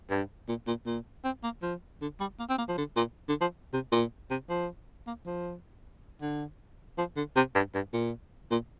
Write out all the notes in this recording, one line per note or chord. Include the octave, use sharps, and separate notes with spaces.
G2
A#2
A#2
A#2
C4
A#3
F3
D3
G3
A#3
C4
A#3
F3
D3
A#2
D3
F3
C3
A#2
C3
F3
A#3
F3
D3
F3
D3
C3
G2
G2
A#2
A#2